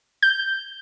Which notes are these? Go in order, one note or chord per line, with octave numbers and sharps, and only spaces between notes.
G6